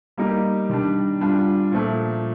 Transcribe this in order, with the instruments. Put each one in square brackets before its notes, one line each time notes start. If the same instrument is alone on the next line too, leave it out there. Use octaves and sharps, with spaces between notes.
[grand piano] G3 A#3 D#4 G4
D#3 G3 D4
G3 D4 F4
A#2 F3 A3